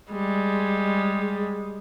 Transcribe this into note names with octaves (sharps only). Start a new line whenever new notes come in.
G3 G#3